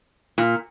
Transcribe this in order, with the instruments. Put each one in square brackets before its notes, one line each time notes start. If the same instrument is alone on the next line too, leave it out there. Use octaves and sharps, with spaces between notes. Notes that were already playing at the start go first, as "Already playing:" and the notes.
[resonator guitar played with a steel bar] A#2